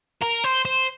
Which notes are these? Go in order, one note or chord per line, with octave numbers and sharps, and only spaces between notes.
A#4
C5
C5